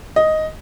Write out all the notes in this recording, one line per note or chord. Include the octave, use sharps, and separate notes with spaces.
D#5